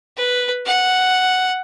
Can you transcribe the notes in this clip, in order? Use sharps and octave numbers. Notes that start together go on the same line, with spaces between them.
B4
F#5